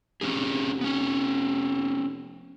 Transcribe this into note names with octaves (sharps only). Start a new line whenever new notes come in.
F1 C#4 G4 G#4
B3 C#4